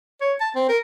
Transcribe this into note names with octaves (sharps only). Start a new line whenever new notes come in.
C#5
A5
C4
A#4